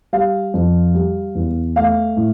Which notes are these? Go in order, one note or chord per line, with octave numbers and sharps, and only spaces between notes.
G3 F5
F2
G3
E2
A3 F5
A2